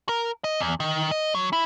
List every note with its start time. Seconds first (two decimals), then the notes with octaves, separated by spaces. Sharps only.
0.09 A#4
0.44 D#5
0.60 E2
0.80 D#3
1.11 D#5
1.35 F#3
1.53 E4